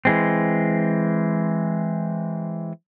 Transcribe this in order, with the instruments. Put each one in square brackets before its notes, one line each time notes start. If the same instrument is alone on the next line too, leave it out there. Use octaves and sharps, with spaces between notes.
[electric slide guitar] E3 G#3 C4